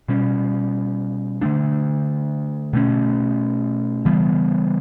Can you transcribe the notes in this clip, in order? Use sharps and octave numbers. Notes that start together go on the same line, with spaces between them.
B2 G3 C#4
D3 A3 D4
B2 A3 C#4
C#3 E3 G3 B3